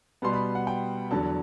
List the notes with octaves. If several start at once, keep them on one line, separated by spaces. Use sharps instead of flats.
B2 G3 B3 C6
B5
F#5
G5
E2 D3 F#3 A5